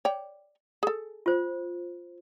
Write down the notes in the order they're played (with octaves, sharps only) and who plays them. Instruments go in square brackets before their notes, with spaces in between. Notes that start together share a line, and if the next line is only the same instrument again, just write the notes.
[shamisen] C#5 D5 G5
G#4 A4
[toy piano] F4 C5